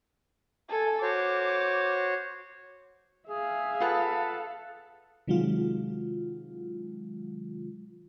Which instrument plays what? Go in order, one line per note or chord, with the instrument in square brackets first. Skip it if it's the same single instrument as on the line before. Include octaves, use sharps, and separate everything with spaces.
[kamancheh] A4 G#5
[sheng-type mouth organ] F#4 C5 C#5 [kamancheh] D6
[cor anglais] G#4 [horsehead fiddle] E5 F5
[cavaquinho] F4 B4 F#5 [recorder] A4
[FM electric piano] C3 D#3 F#3 G#3 F4